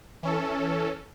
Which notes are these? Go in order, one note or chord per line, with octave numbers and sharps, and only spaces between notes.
E3 C#4 A4